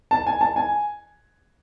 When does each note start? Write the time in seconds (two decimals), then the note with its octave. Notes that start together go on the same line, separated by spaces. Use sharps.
0.11 A5
0.27 G#5
0.41 A5
0.56 G#5